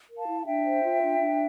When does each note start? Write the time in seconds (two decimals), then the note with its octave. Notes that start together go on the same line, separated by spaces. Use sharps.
0.09 A#4
0.18 F5 A5
0.27 E4
0.41 F5
0.46 D4 E5 G5
0.65 C5
0.83 F4
1.02 D4
1.20 D4